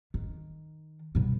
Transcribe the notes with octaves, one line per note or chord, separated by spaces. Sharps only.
D#3
G2 B2